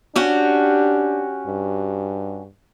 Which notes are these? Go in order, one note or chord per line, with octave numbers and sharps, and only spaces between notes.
C#4 D4 F#4 G4
G2